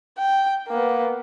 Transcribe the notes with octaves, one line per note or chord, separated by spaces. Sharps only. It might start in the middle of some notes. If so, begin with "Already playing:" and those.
G5
A#3 B3